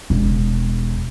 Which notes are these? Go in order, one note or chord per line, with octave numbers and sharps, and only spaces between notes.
E1